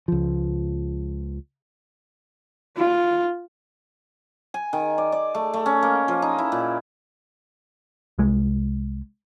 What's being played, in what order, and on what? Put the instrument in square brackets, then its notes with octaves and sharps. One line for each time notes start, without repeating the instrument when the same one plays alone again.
[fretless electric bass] C#2 F3
[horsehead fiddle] F4
[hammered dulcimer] G#5
D#3
D5
D5
A3
A3
C#4
A#3
F3
D#4
E4
A#2
[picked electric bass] C2 G#3